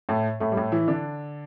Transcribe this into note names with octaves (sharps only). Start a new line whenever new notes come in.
A2 A3
A2 A3
G3
A2 A3
E3 E4
D3 D4